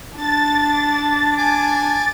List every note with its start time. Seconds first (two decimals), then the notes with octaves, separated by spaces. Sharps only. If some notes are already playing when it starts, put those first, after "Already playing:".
0.16 D4 A6
1.38 G#5 D6